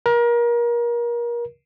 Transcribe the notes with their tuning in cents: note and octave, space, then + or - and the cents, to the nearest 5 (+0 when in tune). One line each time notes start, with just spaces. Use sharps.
A#4 +30